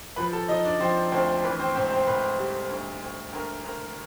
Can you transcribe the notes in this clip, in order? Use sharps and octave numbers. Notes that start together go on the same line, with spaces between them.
F3 B4 B5
A4 A5
F3 D#4 D#5
D4 D5
F3 C4 C5
D2 C4 C5
E3 B4
C4 C5
G#2 C4 C5
C4 C5
G#2 B4
G3
D2
D2
D2 A#4
D2 A#4